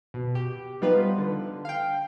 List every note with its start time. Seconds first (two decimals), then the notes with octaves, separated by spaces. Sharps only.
0.14 B2
0.35 G4
0.81 F3 G3 B3 D#4 F4 B4
1.18 D3
1.65 F5 G5